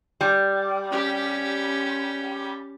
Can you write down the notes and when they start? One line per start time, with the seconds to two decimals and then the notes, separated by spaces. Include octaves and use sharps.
0.21 G3
0.91 C#4 G4